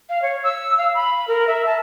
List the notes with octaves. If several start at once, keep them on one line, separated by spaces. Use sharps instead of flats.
F5
C#5
E6
F5
B5
A#4
E5
A5